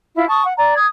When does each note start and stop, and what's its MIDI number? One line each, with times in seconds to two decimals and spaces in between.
0.15 0.28 64
0.15 0.28 65
0.28 0.45 81
0.28 0.45 85
0.28 0.45 87
0.45 0.53 78
0.57 0.76 74
0.57 0.76 82
0.76 0.87 87
0.76 0.87 92